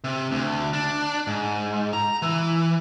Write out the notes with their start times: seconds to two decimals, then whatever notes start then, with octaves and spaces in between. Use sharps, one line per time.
0.04 C3
0.31 D2
0.73 D4
1.27 G#2
1.93 A#5
2.22 E3